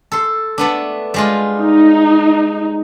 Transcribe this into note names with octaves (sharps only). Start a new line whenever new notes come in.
A4 C6
A3 B3 D4
G3 G#3 F4
D#4